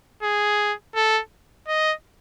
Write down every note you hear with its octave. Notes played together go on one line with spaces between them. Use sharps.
G#4
A4
D#5